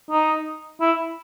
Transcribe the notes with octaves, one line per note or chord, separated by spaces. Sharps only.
D#4
E4